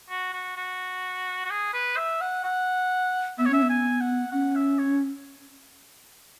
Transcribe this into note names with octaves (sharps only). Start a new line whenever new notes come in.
F#4
F#4
F#4
F#4
G#4
B4
E5
F#5
F#5
B3 E5
C#5
C#4 E5
B3
G#5
F#5
C#4 F#5
E5
C#5